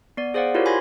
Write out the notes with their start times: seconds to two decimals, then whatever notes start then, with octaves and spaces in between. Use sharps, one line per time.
0.17 B3 D5
0.34 G#4 C5 D5 F5 F#5
0.54 E4 F4 G4 A#4 C5 C#5
0.66 G#5 B5 C6 G#6 A#6